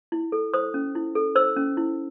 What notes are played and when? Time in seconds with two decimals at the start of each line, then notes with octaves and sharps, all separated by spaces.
0.12 E4
0.32 A4
0.54 C5 D#6
0.74 C#4
0.95 E4
1.15 A4
1.35 C5 E6
1.57 C#4
1.77 E4